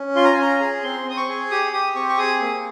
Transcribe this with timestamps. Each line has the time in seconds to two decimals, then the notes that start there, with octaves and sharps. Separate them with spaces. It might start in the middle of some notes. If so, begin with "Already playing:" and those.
Already playing: C#4
0.15 F4 C6
0.24 A#5
0.33 G#5
0.37 C#4 A#5
0.60 G#4
0.83 C4 C6
1.06 C4 D#6
1.17 C#6
1.29 G#4
1.51 G4 D#6
1.73 G4 D#6
1.95 C4 C#6
2.09 C#6
2.18 G#4 D#6
2.41 A#3